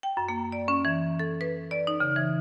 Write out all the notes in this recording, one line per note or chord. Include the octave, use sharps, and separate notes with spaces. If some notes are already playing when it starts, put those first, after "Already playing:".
G5
F#2
A#3
D5
C#4
E3
A4
B4
D5
D#4
C#3
E3